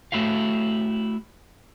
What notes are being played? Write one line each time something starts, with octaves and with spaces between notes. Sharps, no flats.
A3 E4 F#4 G4 F5